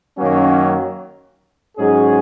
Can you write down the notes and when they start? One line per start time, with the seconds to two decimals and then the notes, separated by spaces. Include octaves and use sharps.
0.18 F#2 D#3 F#3 A#3 C#4
1.76 G#2 F#3 C#4 G#4